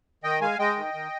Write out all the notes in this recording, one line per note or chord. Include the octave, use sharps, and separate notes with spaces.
D#3 D#5 G5
G#3 F5 G#5
G#3 D#5 G5
D#3
D#3